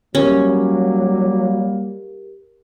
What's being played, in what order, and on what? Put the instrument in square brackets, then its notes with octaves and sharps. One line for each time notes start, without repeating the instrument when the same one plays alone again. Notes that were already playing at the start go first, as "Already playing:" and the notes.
[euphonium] F#3 [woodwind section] G3 A#3 [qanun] C#4 [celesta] G4 A#4